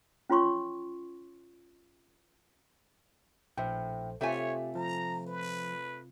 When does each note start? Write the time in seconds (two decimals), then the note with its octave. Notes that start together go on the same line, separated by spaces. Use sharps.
0.30 C#4 F4 C#5 C6 C#6
3.57 A#1 A2 C5 E5 G5
4.21 C3 A3 C4 F4 G4 C#5 E5 G#5
4.75 F3 A#5
5.27 B4